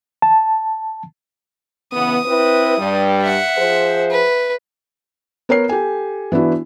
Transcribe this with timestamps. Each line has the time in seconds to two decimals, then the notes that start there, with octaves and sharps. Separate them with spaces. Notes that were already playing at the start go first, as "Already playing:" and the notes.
0.22 A5
1.93 C#3 E3 B3 D#6
2.26 C4 E4 B4
2.79 G2 G3
3.22 E5 F#5
3.58 F3 G#4 C5
4.11 B4
5.49 B3 A#4 C#5 C7
5.69 G4 A4 G#5
6.32 E3 B3 D4 E4 F#4